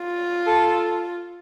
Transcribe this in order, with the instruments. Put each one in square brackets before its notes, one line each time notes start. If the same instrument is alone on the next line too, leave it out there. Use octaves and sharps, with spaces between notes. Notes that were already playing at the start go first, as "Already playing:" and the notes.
Already playing: [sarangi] F4
[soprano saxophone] A4